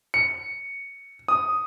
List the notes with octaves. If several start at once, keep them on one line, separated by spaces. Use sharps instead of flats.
C#7
D#6